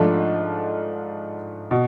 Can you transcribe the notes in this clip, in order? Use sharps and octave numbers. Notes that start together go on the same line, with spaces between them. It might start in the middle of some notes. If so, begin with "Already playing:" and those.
Already playing: G#2 F3 A3 D4 F4
B2